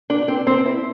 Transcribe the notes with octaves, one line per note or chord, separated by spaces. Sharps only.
D4
C4
C4
E4